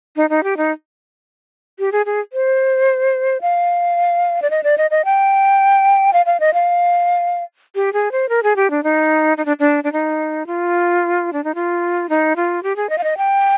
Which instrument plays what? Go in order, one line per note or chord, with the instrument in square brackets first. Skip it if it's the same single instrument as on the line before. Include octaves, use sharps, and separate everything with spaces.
[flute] D#4
D#4
G4
D#4
G4
G#4
G#4
C5
F5
D5
D#5
D5
D#5
D#5
G5
F5
F5
D#5
F5
G4
G#4
C5
A#4
G#4
G4
D4
D#4
D#4
D4
D4
D4
D#4
F4
D4
D#4
F4
D#4
F4
G4
G#4
D#5
F5
D#5
G5